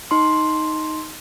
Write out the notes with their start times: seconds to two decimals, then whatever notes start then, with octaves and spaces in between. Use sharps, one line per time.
0.11 D#4 C6